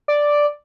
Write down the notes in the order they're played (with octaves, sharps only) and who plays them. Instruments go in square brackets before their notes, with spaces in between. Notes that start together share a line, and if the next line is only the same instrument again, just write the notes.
[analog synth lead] D5